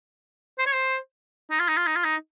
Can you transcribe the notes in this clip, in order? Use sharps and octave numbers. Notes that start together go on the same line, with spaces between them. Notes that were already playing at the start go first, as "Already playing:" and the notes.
C5
C#5
C5
D#4
F4
D#4
F4
D#4
F4
D#4